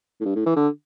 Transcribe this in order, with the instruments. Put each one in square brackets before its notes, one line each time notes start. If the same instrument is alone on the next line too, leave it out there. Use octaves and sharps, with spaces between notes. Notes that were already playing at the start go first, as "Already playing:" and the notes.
[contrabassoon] A2
G2
A2
E3
D3